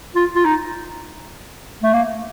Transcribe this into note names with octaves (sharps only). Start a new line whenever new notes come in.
F4
F4
D#4
A3
A#3